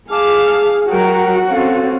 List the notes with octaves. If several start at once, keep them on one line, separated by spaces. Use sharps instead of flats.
G#4 F5 G#5 A5 D6
F#3 F#4 A#4 G5
C4 C#4 A4 C5 F5